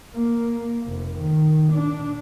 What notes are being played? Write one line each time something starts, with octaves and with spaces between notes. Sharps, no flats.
A#3
F1
D#3
D4